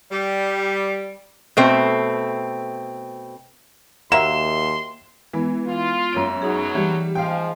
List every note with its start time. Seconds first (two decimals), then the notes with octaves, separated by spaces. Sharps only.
0.12 G3
1.57 B2 A3 C4
4.12 D#2 A#3 F#4 E5 C6 E7
5.33 E3 G#3 B3
5.65 F4
6.13 F#2 C#5 D7
6.42 B2 F#3 D#4 G#4
6.75 E3 G3
7.15 F3 G#3 F5 G5